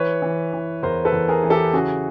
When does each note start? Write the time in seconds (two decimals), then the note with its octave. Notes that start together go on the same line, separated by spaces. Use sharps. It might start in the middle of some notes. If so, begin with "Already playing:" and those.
Already playing: E3 B4 C#5
0.22 E3
0.53 E3
0.83 E2 A#4 C5
1.05 A4 B4
1.13 E2
1.28 G#4 A#4
1.44 E3
1.50 G4 A4
1.73 C#3 F#4 G#4